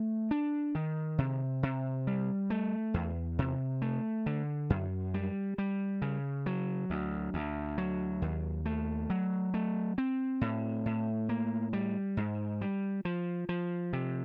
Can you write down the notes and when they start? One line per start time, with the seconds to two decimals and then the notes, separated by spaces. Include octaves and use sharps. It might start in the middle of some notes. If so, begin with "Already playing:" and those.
Already playing: A3
0.31 D4
0.75 D#3
1.18 C3
1.63 C3
2.07 G3
2.50 A3
2.94 E2
3.39 C3
3.82 A3
4.26 D3
4.70 F#2
5.14 G3
5.58 G3
6.02 C#3
6.46 F#3
6.90 D2
7.34 D2
7.78 F#3
8.22 D#2
8.66 A3
9.10 F#3
9.54 A3
9.98 C4
10.41 A2
10.86 A2
11.29 A#3
11.73 G3
12.17 G#2
12.61 G3
13.05 F3
13.49 F3
13.93 C3